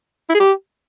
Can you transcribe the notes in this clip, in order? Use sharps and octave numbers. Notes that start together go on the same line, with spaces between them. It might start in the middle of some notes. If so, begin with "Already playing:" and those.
E4
G#4
G4